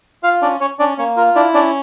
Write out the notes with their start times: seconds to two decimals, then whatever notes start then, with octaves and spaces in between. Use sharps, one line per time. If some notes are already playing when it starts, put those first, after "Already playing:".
0.23 F4 F5
0.42 C#4 D4 D5
0.61 C#4 C#5
0.79 C#4 D4 D5
0.98 A#3 C#4 C#5
1.17 F4 A#4
1.35 D4 E4 D5
1.54 C#4 D4 D5